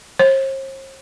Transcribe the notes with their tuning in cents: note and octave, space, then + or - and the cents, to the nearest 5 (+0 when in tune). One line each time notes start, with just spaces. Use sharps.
C5 +45